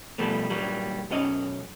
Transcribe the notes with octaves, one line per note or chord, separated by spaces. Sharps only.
B2 F3 G3 A3 B3 A4
A#2 F#3 G3
B1 F#2 F#3 C#4 D#5